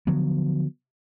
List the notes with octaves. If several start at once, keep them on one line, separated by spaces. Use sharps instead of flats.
D3 F3 F#3 B3